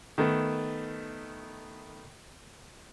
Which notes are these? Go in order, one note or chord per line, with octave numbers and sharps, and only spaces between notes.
D#3 A3 B3